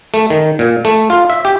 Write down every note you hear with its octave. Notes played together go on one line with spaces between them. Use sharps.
A3
D#3
A#2
A3
F4
E5
G4